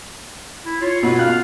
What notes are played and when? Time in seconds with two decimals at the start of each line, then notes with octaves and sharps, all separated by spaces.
0.65 E4
0.81 F4 C#5
1.03 B2 B5
1.19 F5 F#6